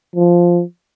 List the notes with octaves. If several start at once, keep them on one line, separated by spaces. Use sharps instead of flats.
F3